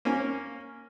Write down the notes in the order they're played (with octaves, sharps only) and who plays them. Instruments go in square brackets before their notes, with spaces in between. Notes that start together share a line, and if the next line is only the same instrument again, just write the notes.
[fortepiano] A#3 C#4